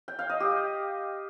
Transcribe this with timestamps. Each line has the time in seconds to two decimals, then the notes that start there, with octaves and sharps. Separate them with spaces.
0.08 G5
0.19 F5
0.30 D#5
0.40 G4